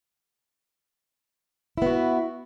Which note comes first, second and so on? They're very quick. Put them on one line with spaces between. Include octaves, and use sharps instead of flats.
E4 B3 F#4